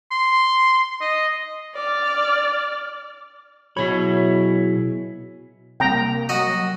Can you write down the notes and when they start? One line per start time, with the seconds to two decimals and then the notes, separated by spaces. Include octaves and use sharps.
0.11 C6
1.01 D#5
1.75 D5 F6
3.77 B2 F#3 E4 G#4 C#5 B5
5.80 C3 G3 A#3 G5 A#5
6.29 F#3 F#4 D#5